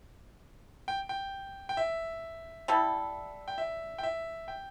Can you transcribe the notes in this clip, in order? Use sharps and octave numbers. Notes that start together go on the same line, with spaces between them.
G5
G5
G5
E5
G3 E4 A4
G5
E5
G5
E5
G5